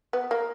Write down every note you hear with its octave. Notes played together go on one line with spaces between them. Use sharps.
B3
A#3